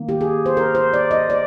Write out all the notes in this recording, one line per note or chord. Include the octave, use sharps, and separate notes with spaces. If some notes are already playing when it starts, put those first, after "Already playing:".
Already playing: D#3 A#3
G4
G#4
C5
A#4
C5
D5
D#5
D5